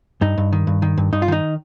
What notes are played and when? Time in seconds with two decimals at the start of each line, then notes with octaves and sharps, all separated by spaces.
0.21 G2 D#4
0.38 G2
0.53 D#3
0.67 G2
0.82 D#3
0.97 G2
1.12 G2 D#4
1.22 F4
1.28 D#3 D#4